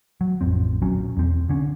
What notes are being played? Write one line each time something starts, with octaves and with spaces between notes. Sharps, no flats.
F#3
A1 F2 C4
D#1 B1 F#3 C#4
E2 C4
C2 D3 C#4